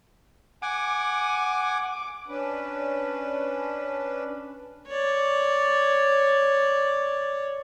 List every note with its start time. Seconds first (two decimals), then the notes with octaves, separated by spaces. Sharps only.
0.62 F#5 G#5 D6
1.92 D6
2.28 C#4 D4 B4
4.87 C#5 D5